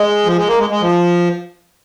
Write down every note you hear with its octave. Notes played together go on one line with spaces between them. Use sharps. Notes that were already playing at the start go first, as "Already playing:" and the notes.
Already playing: G#3
F3
G#3
A#3
G#3
G#3
F3